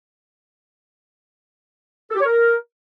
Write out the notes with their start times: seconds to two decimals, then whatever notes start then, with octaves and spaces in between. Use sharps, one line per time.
2.10 A4
2.15 G4
2.20 C#5
2.25 A#4